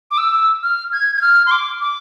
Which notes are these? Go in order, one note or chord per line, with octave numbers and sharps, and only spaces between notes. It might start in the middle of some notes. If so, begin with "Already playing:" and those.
D6
E6
F6
G#6
G#6
F6
C6
D6
D6